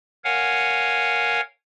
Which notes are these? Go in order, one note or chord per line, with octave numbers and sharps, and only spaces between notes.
A#4 C#5 F5 F#5 G#5